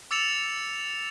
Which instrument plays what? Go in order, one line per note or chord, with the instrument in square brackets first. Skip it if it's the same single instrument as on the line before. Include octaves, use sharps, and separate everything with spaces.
[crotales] D6 E6 A6 C#7 E7 F7